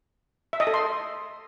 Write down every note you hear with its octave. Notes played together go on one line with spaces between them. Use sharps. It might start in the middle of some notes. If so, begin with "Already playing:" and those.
E5
D#5
A4
C6